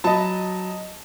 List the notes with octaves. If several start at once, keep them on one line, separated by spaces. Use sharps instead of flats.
F#3 D#5 A5 B5